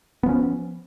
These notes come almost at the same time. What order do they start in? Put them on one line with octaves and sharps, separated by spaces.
B3 F3 C#4